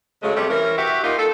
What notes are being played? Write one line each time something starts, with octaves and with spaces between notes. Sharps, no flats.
C#3 F#3 G#3 A3
C3 G3 A3
E3 C#4 A#4
F#4 G4 E5
A#3 D#4 F4
A4